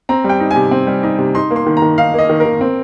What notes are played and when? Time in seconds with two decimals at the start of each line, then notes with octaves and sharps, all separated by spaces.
0.09 C4 A#5
0.24 G3
0.29 G5
0.40 D#4
0.51 G#5
0.56 C3
0.71 C4
0.87 G3
1.03 D#4
1.18 C3
1.35 D#4 C6
1.51 A#3
1.56 C6
1.66 D#3
1.77 A#5
1.82 D#3
1.98 D#4 F5
2.14 A#3 D#5
2.29 D#3
2.40 A#4
2.46 D#3
2.61 C4